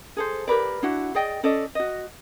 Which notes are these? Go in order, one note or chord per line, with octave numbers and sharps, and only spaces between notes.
G#4 A4 C5
G4 A#4 B4 D5
D4 E4 F#4 F#5
G#4 D5 D#5 G5
C#4 A4 D5 D#5
F#4 D#5